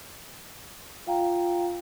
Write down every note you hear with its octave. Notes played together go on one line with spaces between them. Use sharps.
F4 F5 G5 A#5